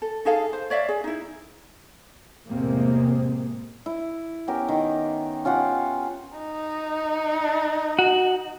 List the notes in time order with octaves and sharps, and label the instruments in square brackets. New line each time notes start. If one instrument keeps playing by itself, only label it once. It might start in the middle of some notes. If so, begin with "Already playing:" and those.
[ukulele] A4
D#4 G#4 A4 F5
C5
C#5 D5 E5 F5
G#4
D#4 E4
[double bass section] E2 A2 C3 G#3 A#3 C4
[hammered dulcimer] E4
B3 C#4 G4 A#4
D#3
C#4 F4 G4 F#5
[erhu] D#4
[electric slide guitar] F#4